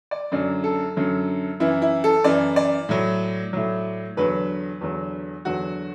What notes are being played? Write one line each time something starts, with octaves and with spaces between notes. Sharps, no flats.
D5
F#2 D3 F#3 D5
A4
F#2 D3 F#3
F#2 E3 E4
E4
A4
F#2 E3 D5
D5
A2 F#3
A2 F#3
E2 D3 F#3 B4
E2 D3 F#3
E2 D3 F#3 F#4